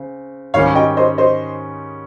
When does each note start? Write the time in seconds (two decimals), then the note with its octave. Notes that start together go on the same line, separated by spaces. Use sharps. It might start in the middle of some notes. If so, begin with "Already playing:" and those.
Already playing: C#3 C4
0.54 G#2 D#3 G3 C#4 C#5 F5
0.75 D#5 G5
0.97 C5 D#5
1.18 C5 D#5